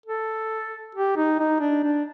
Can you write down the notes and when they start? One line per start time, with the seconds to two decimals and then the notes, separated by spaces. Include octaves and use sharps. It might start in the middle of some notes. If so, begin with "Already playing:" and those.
0.06 A4
0.95 G4
1.17 D#4
1.39 D#4
1.60 D4
1.83 D4